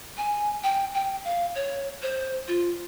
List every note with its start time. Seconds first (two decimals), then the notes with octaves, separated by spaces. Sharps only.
0.18 G#5
0.63 G5
0.94 G5
1.25 F5
1.55 C#5
2.02 C5
2.48 F4